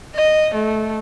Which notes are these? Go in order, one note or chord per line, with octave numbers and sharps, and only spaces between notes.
D#5
A3